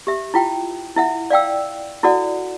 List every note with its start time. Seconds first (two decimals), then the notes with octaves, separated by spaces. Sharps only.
0.07 G4 E5
0.34 E4 F4 G5
0.96 E4 E5 F#5
1.30 D5 F5 G5 E6
2.03 E4 F#4 A4 D5 F#5